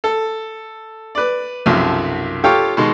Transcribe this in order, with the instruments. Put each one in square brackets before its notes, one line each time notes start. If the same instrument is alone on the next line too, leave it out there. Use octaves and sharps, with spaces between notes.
[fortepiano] A4
B4 D5
B1 F#2 C3 F3
F4 G4 A4 C#5 F5 G5
B2 D#3 G#3 C6